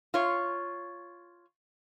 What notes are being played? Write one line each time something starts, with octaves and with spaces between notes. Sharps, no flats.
F4 C#5